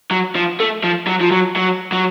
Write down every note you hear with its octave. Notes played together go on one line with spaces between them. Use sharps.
F#3
F3
A3
F3
F#3
F3
F#3
F#3
F#3